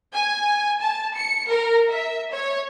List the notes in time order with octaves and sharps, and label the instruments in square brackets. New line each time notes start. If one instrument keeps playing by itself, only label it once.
[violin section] G#5
A5
C#7
A#4
E5
C#5